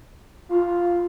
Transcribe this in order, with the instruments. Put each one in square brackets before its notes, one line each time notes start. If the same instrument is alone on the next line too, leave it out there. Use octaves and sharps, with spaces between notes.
[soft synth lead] F4